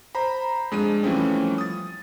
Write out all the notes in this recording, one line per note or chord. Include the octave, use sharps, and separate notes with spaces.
C5 A#5 B5
F2 G#3 D4 D#7
E3 F3 G3 A3 C4 C#4
D#6 A6